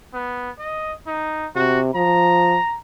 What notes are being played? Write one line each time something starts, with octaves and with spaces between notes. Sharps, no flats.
B3
D#5
D#4
C3 F#4
F3 A#5